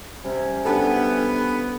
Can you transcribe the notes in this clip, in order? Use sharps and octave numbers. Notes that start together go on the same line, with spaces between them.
C3 G3 C#4
B3 D4 G4 A4